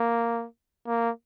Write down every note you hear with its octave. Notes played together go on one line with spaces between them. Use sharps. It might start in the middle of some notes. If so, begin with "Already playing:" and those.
Already playing: A#3
A#3